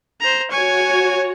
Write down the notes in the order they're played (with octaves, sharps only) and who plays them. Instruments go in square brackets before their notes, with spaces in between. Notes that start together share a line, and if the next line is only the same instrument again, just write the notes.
[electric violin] C5 A#5
[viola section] F#4 C#5 [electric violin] G#5 C#6